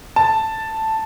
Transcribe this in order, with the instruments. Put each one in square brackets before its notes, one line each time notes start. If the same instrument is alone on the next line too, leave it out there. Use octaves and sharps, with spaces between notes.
[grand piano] A5